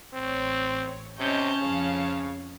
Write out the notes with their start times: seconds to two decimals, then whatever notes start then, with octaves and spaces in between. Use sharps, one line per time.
0.14 A1 C4 C#5
1.19 C3 C#4 C#5 D#5 A5 G6
1.62 F2 C#3 C#5 F5